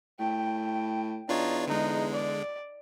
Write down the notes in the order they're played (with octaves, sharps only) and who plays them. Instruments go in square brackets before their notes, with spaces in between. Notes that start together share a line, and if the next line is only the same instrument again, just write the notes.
[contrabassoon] A2 [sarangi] G5
[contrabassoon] E2 [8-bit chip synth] D4 F4 C#5 [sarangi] D#4
[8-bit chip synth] D3 G#3 [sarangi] D#4
[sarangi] D5